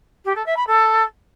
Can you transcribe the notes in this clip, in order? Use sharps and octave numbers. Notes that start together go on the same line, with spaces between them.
G4
A4
E5
B5
A4